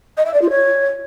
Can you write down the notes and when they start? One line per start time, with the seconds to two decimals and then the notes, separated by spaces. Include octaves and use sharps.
0.17 D#5
0.25 E5
0.33 D5
0.41 F4
0.50 C#5